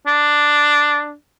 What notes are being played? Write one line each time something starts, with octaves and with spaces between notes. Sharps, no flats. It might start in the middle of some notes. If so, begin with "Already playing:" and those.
D4